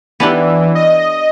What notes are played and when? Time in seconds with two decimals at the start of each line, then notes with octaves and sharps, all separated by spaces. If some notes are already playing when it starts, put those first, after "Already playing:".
0.20 E3 B3 D4 G4
0.75 D#5